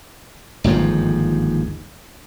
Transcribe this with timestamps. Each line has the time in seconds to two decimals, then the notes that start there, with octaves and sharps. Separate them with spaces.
0.64 G1 D#2 G#2 F3